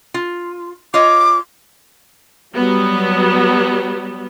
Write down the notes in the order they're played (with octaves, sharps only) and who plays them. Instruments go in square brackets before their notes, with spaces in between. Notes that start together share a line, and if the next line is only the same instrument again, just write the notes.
[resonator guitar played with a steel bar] F4
[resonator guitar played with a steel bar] F4 C#5 D#5 [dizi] D6
[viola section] F#3 G3 B3